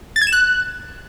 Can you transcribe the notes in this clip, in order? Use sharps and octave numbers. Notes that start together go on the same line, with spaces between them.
A6
G#6
E7
F#6